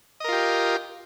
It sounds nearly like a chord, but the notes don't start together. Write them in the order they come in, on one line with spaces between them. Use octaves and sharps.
D#5 A#4 F4 G4